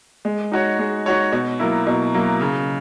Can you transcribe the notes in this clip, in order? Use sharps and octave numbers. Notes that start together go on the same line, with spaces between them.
G#3
D#4 F#4 C#5
G#3
D#4 F#4 C#5
B2
F#3 A#3 E4
B2
F#3 A#3 E4
C#3